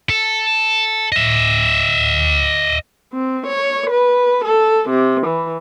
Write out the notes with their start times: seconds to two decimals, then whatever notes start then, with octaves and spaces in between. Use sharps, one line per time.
0.10 A4
1.12 D#5 E5
3.13 C4
3.47 C#5
3.91 B4
4.45 A4
4.89 C3
5.26 E3